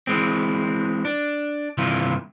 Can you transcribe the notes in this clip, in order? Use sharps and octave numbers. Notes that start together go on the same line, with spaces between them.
E3 G#3 C4
D4
G2 C3 D#3 E3 E4 F4